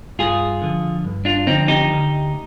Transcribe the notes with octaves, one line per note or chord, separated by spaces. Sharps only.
G2 F4 G#4
D3 F3
G2
D4 F4
D3 F3 C4 D#4
D#4 G4
D2